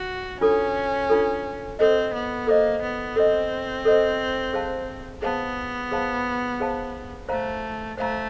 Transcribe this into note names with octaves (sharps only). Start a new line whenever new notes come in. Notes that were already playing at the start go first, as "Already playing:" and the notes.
Already playing: F#4
C#4 D4 F4 A4
D4 F4 A4
C4 A4 C5 D#5
B3
A#3 A4 C5 D#5
B3
C4 A4 C5 D#5
A4 C5 D#5
G#4 C5 F5 A5
B3 G#4 C5 F5 A5
G#4 C5 F5 A5
G#4 C5 F5 A5
A3 C5 F5 A#5
A3 C5 F5 A#5